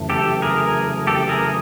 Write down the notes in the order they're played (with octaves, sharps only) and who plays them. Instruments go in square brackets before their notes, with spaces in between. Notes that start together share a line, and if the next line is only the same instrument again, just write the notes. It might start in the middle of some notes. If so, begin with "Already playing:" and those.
Already playing: [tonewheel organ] F#2 C#3 E3 A3
[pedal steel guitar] G4 A4
G#4 A#4
G4 A4
G#4 A#4